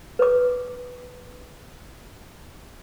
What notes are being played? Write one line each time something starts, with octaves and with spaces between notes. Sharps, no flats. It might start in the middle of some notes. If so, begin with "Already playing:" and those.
B4 C#5 D6